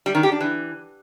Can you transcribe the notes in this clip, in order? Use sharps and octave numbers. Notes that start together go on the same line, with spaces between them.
G3
D#3
G4
D4
E3